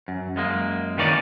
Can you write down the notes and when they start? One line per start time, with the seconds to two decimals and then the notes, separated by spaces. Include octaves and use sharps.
0.08 F#2
0.36 F#2 G#3 A#3
0.97 D#3 E3 A#3 C#4 D#4 D5